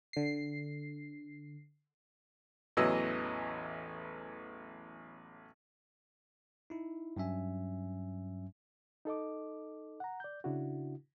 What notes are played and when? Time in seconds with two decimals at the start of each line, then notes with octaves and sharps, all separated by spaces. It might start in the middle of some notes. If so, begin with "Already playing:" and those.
0.13 D3 C7
2.77 A1 E2 E3 F#3 D#5 E6
6.70 D#4 E4
7.17 G2 F#3 C#4 E5 G#5
9.05 D#4 A4 D#5 D6
10.00 F#5 A#5
10.20 D5 G6
10.44 C#3 D4 E4 F#4